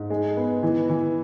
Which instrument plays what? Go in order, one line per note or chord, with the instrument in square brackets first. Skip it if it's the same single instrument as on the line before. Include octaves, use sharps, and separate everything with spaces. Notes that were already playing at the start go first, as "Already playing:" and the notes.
Already playing: [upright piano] G#2
G#3
B3
E3
E3